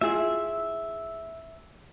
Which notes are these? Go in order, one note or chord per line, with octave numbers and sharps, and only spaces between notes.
E4 F4 G#4 E5